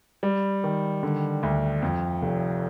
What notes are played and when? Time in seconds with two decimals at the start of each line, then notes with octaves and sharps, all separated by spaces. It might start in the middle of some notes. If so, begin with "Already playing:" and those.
0.23 G3
0.64 D#3
1.03 D3
1.43 D2
1.82 F2
2.22 F1